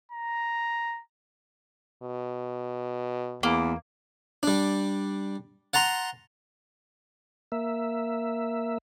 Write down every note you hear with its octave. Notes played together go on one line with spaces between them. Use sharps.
A#5
B2
E2 A#3
G3 D4
F#5 A5 A#5 C6
A#3 E5